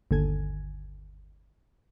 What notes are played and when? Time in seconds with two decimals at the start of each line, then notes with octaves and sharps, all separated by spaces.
0.11 G1 D#2 D3 A4 G#5 G#6